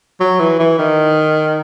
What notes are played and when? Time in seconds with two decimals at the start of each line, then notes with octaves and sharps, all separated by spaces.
0.20 F#3
0.40 E3
0.59 E3
0.78 D#3